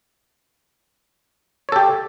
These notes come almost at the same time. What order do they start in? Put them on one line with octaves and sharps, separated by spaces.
C#5 A4 G4